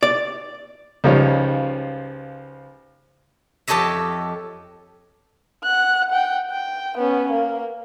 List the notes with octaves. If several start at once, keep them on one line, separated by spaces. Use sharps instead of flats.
D5
C#2 C#3 F3 G3 D#4 C#5
F2 G4 A4 C#5 D#5 E5
F#5 F#6
F#5 G5
G5
B3 C#4
A#3